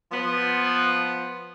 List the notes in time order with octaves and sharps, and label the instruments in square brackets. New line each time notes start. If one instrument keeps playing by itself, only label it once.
[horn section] F3 B3